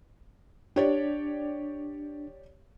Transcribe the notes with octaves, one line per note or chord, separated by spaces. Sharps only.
D4 G4 C#5 D5